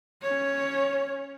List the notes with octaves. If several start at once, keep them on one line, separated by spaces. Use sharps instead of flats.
C#4 C#5